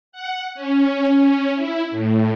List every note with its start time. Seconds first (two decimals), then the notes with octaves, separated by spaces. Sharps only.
0.12 F#5
0.55 C#4
1.55 E4
1.91 A2